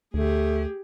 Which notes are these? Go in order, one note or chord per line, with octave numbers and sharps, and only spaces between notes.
D2 A3 G4 G#4